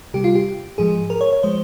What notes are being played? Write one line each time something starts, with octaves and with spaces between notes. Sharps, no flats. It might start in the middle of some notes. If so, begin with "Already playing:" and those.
C3 G3 G4
F4
G4
G#2 F3 G#3 G#4
A#4
C#5
C#5
F3 G#3 C5